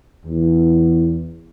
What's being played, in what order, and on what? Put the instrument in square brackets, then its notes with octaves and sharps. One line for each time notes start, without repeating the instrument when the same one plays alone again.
[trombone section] E2